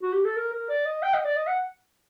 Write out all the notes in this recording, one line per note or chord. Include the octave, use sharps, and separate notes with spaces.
F#4
G4
A4
A#4
A#4
D5
D#5
G5
D#5
D5
D#5
F#5